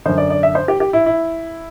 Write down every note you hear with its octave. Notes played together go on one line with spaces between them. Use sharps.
F#2 D3 C5
D5
D5
E5
C5
G4
G4
E4
E4